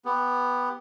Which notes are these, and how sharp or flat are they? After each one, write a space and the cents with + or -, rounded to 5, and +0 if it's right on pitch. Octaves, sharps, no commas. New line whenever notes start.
B3 +0 G4 +15